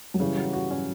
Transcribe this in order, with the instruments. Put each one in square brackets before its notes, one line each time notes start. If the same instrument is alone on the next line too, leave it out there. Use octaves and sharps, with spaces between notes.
[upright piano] F#3
[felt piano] C#3 [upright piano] E3 G3
[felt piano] F#3
F#4
C#4